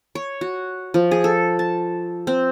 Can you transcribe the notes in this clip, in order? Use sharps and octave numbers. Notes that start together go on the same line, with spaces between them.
C#5
F#4
F3
G#4
A4
A5
C4